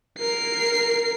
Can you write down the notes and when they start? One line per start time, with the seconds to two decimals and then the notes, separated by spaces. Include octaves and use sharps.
0.19 A#4 C7